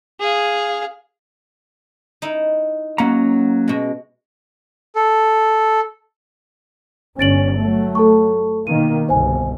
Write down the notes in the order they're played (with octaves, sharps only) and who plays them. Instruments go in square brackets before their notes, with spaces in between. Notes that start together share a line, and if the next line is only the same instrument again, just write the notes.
[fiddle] G#4 F5
[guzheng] D#4 E4
[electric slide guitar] F#3 A#3 A#5 [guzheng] C#4 F#4
[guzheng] B2 G#3
[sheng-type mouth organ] A4
[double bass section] G1 C#4 [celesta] A6 D7 F#7
[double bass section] F#3 A3
[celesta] A4 A5 C#6
[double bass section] B2 D#3 A#3 [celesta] D#7
[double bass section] G1 C2 B2 [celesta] C5 G#5